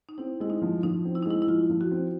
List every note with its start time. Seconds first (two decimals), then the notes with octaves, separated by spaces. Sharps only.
0.09 D#4
0.18 C4 E4
0.40 G#3 E4
0.50 D#4
0.62 F3
0.83 F3 D#4
1.05 C4
1.15 E4
1.23 D#4
1.26 G#3 E4
1.42 E4
1.47 F3 F4
1.70 F3
1.81 F#4
1.91 C4